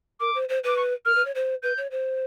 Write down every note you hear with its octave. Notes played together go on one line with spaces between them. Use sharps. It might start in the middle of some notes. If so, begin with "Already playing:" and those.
A#4 D6
C5
C5
B4 D6
C#6
A#4 F6
B4
C#5
C5
B4 G6
C#5
C5